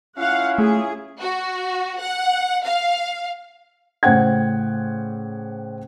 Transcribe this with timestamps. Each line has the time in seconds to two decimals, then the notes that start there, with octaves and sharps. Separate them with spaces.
0.18 C#4 E4 F4 F5 F#5
0.58 A3 G#4
1.21 F#4
2.00 F#5
2.65 F5
4.03 A2 C#3 C5 F#5 G5 G#6